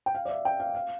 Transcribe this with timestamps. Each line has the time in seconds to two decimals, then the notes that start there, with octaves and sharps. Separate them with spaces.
0.06 G5
0.15 F5
0.25 D5
0.29 E5
0.45 G5
0.60 F5
0.75 F5